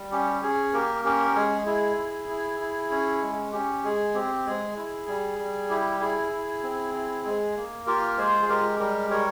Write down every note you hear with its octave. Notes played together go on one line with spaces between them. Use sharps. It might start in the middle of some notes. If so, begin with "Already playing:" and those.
Already playing: G3
C#4 G4
C#4 G#4
A#3 G4 A#4
C#4 G4 A#4
G#3 G#4
E4 G#4
E4
E4
E4
C#4
G#3
C#4 G4
G#3 G#4
C4 G4
G#3 G#4
E4
G3
G3
E4 G4
E4 G#4
E4
C4
E4
G#3
A#3
F4 G4 A#4
G#3 G#4 C5
G#4
G#3 G4 A#4
G3 G4 A#4
G3 A#4 C#5